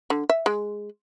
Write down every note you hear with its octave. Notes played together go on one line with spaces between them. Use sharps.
D3
E5
G#3